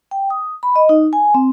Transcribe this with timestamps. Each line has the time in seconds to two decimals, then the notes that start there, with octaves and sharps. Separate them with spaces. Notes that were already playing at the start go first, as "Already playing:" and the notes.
0.11 G5
0.30 D#6
0.63 B5
0.76 D#5
0.89 D#4
1.13 G#5
1.34 C4